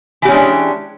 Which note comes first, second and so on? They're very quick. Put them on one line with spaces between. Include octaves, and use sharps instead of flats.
E3 G4 C#4 G#3 D4